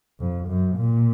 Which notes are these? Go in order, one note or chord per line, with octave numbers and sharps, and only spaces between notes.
F2
F#2
A#2